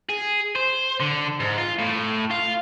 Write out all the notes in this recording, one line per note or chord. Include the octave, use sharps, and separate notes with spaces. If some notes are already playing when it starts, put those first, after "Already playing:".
G#4
C5
D3
G#2
F4
A2
F4